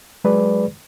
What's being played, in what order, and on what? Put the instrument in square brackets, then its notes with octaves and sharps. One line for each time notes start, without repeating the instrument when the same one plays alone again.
[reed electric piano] F#3 G#3 G#4 B4 D5